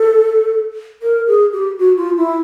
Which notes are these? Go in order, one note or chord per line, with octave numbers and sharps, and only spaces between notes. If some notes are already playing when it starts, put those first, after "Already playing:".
Already playing: A4
A#4
G#4
G4
F#4
F4
E4